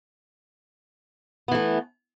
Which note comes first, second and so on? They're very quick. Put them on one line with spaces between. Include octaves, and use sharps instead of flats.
B3 E3 A3